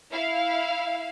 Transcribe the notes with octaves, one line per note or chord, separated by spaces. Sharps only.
E4 F5